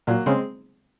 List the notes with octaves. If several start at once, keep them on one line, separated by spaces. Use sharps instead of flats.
A#2 F#3 A#3
C#3 G#3 C4